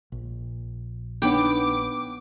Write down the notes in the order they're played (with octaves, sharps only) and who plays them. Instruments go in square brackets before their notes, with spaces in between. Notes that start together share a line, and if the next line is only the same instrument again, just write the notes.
[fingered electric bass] A#1
[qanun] B3 G5 [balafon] D4 D#4 C#5 [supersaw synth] D6